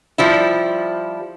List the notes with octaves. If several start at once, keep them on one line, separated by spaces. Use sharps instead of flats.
F3 G3 E4